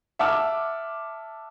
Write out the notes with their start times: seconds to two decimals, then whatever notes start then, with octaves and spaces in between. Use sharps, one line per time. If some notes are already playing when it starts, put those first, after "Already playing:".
0.19 E5 F#5 A5 D6 F6